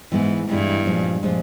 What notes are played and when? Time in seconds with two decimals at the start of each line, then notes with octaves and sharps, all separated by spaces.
0.12 G#2 E3 G#3 B3 E4
0.49 G2 E3 G#3 B3 E4
0.86 A#2 F3 G#3
1.23 A#2 F3 G#3